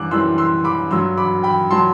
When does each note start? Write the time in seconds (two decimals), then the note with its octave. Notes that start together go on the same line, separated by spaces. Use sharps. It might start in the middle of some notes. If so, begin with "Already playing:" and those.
Already playing: F#2 E3 G3 D6 E6 F#6
0.11 F#2 E3 G3 C6 E6
0.38 C6 E6
0.64 B5 D6
0.91 G2 F#3 C6 E6
1.18 B5 D6
1.43 G5 B5
1.70 F#3 A5 C6